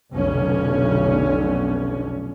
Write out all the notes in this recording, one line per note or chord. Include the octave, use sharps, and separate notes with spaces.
F1 B1 D3 C#4